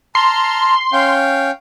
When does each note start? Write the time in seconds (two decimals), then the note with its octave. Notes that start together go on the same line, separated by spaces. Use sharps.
0.15 A5 A#5 C6 F6
0.93 C#4 F5 G5